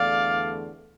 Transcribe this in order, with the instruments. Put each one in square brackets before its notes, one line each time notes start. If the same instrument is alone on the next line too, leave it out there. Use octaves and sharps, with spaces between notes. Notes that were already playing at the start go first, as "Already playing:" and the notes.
Already playing: [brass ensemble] E2 D3 A3 D5 F5